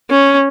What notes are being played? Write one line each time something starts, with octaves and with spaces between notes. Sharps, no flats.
C#4